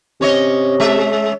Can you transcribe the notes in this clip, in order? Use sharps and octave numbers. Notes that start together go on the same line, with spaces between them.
C3 C#4 C#5 D#5
G#3 E5